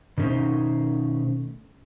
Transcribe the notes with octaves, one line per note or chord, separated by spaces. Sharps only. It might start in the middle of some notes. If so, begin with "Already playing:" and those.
B2 D#3 A3 C#4 D#4 C5